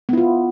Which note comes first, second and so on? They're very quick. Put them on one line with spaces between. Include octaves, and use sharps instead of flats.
B3 E4 F4